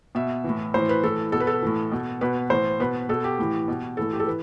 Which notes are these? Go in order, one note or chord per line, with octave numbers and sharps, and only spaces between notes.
B2 E5
A2 E3
A2 E3 C5
B4
A2 E3 A4
B2 A4
B4
A4
A2 E3
B2
B2 B4
A2 E3 C5
B2 B4
B2 A4
G4
A2 E3
B2
A2 E3 A4
G4
A4
E3 B4